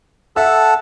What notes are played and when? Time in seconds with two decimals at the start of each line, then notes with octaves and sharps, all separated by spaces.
0.36 A4 E5 F#5 A5 E6